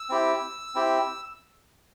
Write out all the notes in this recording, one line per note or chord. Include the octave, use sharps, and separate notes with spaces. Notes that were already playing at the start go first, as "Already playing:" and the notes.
Already playing: E6
C4 E4 G4
C4 E4 G4